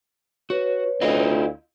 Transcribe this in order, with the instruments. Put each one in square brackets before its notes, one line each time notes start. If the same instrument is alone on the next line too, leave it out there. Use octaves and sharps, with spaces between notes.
[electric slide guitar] F#4 [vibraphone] B4 C#5
[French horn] D2 [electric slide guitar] E4 F4 D#5